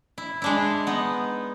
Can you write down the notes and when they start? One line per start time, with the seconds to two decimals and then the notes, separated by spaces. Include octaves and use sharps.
0.18 E4
0.42 G#3 D4 E4
0.87 B3 D#4